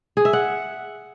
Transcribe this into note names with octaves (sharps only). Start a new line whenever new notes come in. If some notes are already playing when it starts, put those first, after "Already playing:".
G#4
E5
F#5